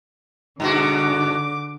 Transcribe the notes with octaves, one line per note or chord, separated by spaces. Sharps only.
G2 B2 D3 F#4 D6